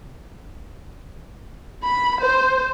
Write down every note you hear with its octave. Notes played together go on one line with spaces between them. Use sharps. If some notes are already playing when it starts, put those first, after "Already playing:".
B5
C5